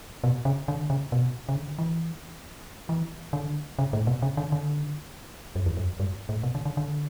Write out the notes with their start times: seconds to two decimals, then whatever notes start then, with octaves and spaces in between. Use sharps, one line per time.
0.24 B2
0.45 C#3
0.68 D3
0.90 C#3
1.12 B2
1.49 C#3
1.56 D3
1.78 E3
2.89 E3
3.33 D3
3.79 C#3
3.93 A2
4.07 B2
4.22 C#3
4.37 D3
4.52 D3
5.56 F#2
5.66 E2
5.77 F#2
6.00 G2
6.29 A2
6.43 B2
6.55 D3
6.66 D3
6.77 D3